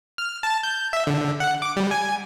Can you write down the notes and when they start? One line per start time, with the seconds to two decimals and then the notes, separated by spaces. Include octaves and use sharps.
0.18 F6
0.43 A5
0.63 G6
0.93 E5
1.07 D3
1.40 F#5
1.62 D6
1.76 G3
1.91 G#5